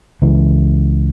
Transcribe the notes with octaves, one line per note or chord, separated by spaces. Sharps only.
C#2 E3